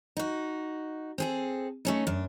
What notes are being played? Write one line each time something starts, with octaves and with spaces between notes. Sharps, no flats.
D#4 F#4
C4 G#4 A4
A3 C#4 D#4
F#2 D4